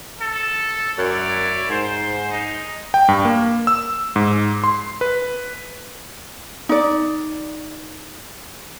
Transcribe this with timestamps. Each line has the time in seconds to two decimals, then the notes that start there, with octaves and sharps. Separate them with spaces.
0.19 A4
0.98 F#2 E4 C#5 D5
1.70 G#2 C5
2.30 G#3 D#4
2.94 G5
3.08 G2
3.25 A#3
3.67 E6
4.16 G#2
4.64 C6
5.01 B4
6.69 D#4 D5